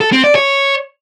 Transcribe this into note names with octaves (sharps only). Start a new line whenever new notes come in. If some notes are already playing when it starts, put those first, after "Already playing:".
A4
C4
D5
C#5